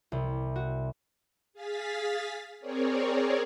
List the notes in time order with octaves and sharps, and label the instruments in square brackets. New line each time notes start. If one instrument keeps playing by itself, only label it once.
[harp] C2
F#4
[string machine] G#4 F5 A6 B6
C4 G#4 A#4 C#5 D5